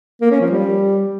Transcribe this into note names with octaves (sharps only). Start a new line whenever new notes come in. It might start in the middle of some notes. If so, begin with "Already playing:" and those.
A#3
C#4
F3
G3